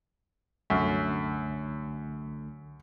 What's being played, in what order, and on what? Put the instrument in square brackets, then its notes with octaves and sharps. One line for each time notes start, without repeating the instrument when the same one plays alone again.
[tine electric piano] C2 D3 A3 [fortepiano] F#2